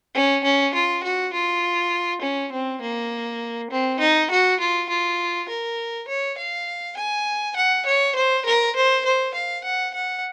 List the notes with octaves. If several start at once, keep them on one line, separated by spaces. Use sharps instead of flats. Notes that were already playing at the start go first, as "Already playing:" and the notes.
C#4
C#4
F4
F#4
F4
C#4
C4
A#3
C4
D#4
F#4
F4
F4
A#4
C#5
F5
G#5
F#5
C#5
C5
A#4
C5
C5
F5
F#5
F#5